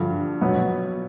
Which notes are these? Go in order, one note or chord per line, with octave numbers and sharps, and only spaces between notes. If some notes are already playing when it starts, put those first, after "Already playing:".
Already playing: G2 D3 F3
B2 F#3 B3